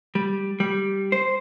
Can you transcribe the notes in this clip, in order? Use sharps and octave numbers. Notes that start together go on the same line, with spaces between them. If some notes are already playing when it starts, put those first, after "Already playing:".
G3
G3
C5